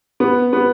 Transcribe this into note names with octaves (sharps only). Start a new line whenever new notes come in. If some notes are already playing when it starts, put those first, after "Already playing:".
B3
B3